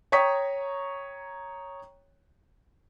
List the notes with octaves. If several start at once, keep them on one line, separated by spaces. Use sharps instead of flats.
C#5 G5 A#5 C#6 D#6 B6